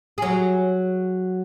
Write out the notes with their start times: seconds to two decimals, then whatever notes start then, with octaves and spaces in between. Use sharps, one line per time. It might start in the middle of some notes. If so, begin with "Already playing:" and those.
0.18 F#3 G#4